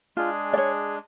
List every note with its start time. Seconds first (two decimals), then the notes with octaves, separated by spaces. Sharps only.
0.17 G#3 D4 F4 G#4
0.53 D5
0.58 C#5